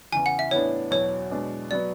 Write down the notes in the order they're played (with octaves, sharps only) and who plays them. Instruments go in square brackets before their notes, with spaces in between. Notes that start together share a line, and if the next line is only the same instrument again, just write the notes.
[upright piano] E2 C#3 E3 [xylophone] G#5
[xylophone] F#5
E5
[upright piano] A2 E3 B3 D4 [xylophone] C#5
[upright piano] E2 B2 F#3 [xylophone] C#5
[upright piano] B2 G#3 D4
[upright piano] F#3 B3 [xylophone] D5